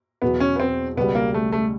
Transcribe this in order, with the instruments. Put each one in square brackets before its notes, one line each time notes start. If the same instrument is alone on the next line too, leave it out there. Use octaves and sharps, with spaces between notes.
[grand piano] E2 B2 F#3 [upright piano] B3
[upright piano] C#4
B3
C4
[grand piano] C#2 B2 G3 [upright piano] B3
[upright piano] A#3
A3
A3